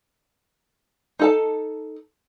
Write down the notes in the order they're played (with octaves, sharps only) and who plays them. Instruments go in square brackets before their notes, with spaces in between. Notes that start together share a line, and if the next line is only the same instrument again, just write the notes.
[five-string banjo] D#4 A4 A5